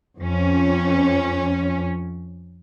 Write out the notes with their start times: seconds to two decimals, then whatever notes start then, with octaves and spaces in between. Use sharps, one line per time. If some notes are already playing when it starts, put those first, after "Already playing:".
0.19 F2 C#4